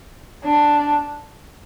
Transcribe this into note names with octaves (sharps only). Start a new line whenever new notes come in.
D4